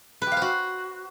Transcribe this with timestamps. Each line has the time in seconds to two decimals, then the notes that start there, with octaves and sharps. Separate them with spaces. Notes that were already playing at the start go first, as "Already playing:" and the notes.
0.22 B4
0.27 G4
0.32 F5
0.37 C5
0.42 F#4